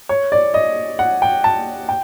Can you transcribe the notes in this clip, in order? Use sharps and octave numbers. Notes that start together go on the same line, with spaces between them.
C#5
D5
D#5
F#5
G5
A5
G5